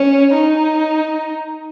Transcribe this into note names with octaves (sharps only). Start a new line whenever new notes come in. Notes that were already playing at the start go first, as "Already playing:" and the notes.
Already playing: C#4
D#4